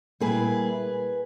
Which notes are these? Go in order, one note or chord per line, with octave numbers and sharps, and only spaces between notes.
A#2 G3 A#3 E4 G#4 B4